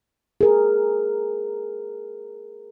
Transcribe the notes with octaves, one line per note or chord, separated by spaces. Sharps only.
G#4 A#4